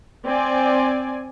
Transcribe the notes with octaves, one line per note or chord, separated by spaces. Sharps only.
C4 D5 G#5